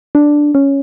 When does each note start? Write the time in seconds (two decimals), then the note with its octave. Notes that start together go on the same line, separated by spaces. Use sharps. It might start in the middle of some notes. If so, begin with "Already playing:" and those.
0.15 D4
0.55 C#4